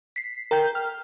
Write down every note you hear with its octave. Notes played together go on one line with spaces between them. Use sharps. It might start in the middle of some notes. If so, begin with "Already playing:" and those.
B6 C7
A#4 G5 G6
F6